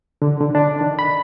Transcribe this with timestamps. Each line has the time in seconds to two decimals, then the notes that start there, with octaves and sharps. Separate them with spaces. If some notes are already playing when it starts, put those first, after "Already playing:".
0.22 D3
0.41 D3
0.55 D4
0.81 D#3
0.99 B5